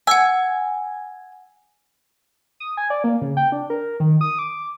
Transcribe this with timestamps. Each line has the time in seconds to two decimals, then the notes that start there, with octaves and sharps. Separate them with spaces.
0.07 F#5 G#5 E6
2.60 D#6
2.77 G#5
2.90 D5
3.04 A#3
3.22 C#3
3.37 G5
3.52 D4
3.70 A#4
4.00 D#3
4.21 D#6
4.39 D6